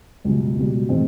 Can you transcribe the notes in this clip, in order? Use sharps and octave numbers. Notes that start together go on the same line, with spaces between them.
C#2 B2 G3
C#2 B2 G3
A2 E3 G#3 C4 D#4